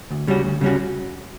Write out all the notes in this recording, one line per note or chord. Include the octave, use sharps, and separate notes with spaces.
D2
C#3 G3 C#4 F#4
D2
C#3 G3 C#4 F#4